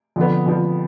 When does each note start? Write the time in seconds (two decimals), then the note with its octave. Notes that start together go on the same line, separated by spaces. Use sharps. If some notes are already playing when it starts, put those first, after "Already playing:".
0.16 F2 D3 F3 B3
0.46 F2 D3 F3 B3